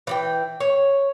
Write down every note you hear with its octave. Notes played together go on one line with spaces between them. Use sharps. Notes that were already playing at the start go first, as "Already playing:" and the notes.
E3 D5 G5
C#5